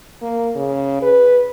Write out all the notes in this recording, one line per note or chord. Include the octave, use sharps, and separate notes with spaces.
A#3
C#3
B4